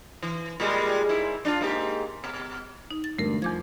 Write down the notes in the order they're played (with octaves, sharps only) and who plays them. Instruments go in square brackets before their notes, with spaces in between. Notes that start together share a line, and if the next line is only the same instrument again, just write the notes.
[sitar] E3
A#2 G3 G#3
G#2 E4
D4 D#4 F4
G#2 A#3 G4
B2
[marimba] D#4
A6
[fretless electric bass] E1 D2 G2 [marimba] A3 A#4
[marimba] E2 D6 G#6 [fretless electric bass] F3